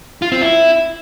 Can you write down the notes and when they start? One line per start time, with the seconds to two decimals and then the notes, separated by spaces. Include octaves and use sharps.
0.22 F4
0.32 C4
0.41 E4